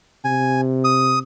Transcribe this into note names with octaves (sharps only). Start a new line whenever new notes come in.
C3 G#5
D#6